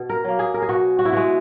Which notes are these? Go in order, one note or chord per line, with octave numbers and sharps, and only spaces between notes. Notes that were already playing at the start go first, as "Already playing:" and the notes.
Already playing: B2
A#4
F#3 A#3
G#4
A#4
G#4
B2 F#4
F#4
E4
G#3 B3 F#4